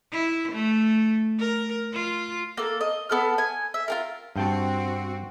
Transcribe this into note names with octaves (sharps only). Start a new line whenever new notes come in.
E4
A3
A#4
F4
A#3 A4
D#5
B3 A4 F6
G#5
E5
F4 G#4 A#4
G2 C4 F#4 G5 A5